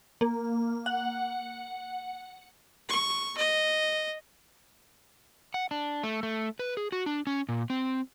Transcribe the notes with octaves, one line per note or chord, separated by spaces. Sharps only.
A#3
F#5
C#6
D#5
F#5
D4
A3
A3
B4
G#4
F#4
D4
C#4
A#2
C4